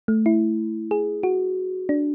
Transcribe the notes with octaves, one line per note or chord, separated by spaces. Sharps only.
A3
E4
G#4
F#4
D4